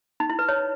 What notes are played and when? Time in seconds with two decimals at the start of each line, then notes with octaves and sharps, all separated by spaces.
0.20 D#4
0.30 E4
0.39 B4
0.49 C#5